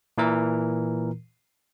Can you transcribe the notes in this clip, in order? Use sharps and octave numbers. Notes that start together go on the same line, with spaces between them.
A#2 E3 A#4